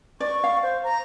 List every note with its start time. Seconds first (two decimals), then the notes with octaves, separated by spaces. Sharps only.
0.20 D5 C#6
0.44 F5
0.62 C5
0.84 A#5